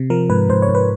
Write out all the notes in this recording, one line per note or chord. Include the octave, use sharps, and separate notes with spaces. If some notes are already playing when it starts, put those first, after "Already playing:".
Already playing: C3
F3 A#4
G#2 B4
G#2 C5
C#5
G#2
B4